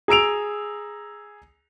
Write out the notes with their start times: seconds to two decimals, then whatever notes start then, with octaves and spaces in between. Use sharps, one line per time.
0.08 G#4 A#5 E6 D7 F7